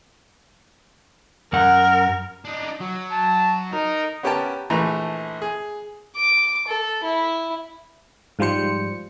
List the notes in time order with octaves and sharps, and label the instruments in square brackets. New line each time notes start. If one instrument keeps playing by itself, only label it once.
[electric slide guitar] F#2 F#5 [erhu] A#4
[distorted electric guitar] D4 D#4
F#3
[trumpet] A5
[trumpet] D#4 [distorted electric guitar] A#4
[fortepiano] B3 C#4 G4 A#4 G5 A5
A#1 E3 A3 A#5
G#4
[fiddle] D6
A4
E4
[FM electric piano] G#2 F3 G3 C5 C#7